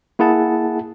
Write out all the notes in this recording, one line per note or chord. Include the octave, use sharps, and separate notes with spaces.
A#3 E4 G#4 F#5 A5